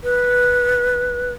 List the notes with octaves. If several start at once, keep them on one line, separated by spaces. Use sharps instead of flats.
B4